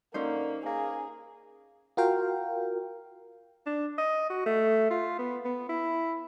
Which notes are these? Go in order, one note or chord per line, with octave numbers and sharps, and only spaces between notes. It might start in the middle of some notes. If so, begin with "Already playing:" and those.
D3 A#3 C#4 D#4 C5
A#3 G#4
F4 F#4 A#4 F5 G5
D4
D#5
F#4
A3
F4
B3
B3
E4